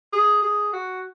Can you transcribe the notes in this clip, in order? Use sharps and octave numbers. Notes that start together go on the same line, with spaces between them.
G#4
G#4
F#4